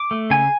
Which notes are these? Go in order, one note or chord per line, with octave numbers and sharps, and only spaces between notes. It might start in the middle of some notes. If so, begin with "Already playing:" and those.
Already playing: D6
A3
C#3 G#5